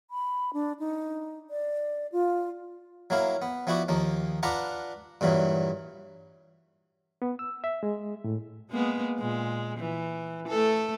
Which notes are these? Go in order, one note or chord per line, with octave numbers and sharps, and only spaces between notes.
B5
D4
D#4
D5
F4
F#3 A#3 E4 F5
B3
F3 B3 E4 F#4 D5
D#2 F3 A#3
D4 F4 B4 D5 F#5 A#5
G2 A#2 E3 F#3
B3
E6
E5
G#3
A2
G#3 A#3 B3
A#2 G#3
E3
A3 A4